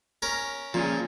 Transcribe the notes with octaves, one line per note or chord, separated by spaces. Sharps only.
C#4 A#4
A#2 F3 C#4 G#4